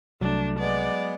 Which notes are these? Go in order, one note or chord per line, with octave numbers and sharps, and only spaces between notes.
C2 F#3 A3 D4
G#3 B3 D5